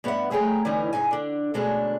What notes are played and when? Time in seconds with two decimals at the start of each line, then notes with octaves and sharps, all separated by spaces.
0.04 G2 B3 G#4 C#5 E5 F#5
0.30 F2 A3 G#4 C#5 G5 A#5
0.65 D3 E3 G3 B3 C#4 D#4
0.93 F2 G#2 C3 D#4 G#5
1.11 D3 D4
1.54 D2 B2 G#3 C#4 D4 A4